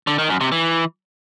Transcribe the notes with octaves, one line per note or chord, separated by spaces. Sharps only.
D3
D#3
F#2
C3
E3